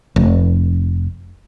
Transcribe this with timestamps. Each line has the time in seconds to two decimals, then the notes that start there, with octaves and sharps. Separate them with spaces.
0.16 F1